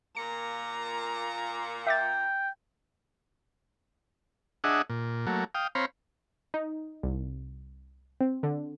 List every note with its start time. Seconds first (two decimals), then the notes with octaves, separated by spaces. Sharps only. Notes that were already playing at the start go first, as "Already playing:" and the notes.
0.17 A#2 A#3 A#5 C#7
1.87 E5 G5 D6 A6
4.64 D4 G#4 D#5 E5 F#5
4.90 A#2
5.27 F#3 A3 A#3
5.55 F5 G5 D#6
5.75 C4 C5 C#5 F5 A#5 B5
6.54 D#4
7.03 C2
8.21 C4
8.43 D3